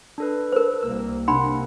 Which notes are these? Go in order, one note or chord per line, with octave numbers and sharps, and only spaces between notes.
D4 A4 B4
A#4 C5
C2 A#3 E6
C3 A#3 D4 F#5 B5 C6